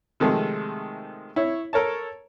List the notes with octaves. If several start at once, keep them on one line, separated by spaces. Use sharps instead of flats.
C3 D#3 F3 G#3 A3
E4 C#5
A4 A#4 C#5 A5